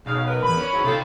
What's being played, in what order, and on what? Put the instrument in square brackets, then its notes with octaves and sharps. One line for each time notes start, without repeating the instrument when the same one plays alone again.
[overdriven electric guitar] B1 [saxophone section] C#3 F5
[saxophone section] A#4 B4
[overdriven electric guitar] E2 G#2 [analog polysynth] B5
[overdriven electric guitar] C#4
[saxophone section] G#2 E3 F#3
[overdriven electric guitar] C3 G5 [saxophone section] D#4 F4 A4